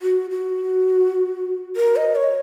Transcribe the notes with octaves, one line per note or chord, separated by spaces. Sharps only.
F#4
F#4
A#4
D#5
C#5